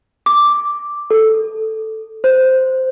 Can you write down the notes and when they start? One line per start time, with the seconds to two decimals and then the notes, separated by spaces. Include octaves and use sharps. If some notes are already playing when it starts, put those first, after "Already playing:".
0.26 D6
1.11 A4
2.24 C5